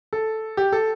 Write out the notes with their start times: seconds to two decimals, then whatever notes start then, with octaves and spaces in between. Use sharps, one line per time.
0.13 A4
0.57 G4
0.72 A4